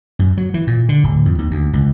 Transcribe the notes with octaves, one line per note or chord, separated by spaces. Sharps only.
F#2
F#3
E3
A#2
D3
D1
F2
D#2
D2
C#2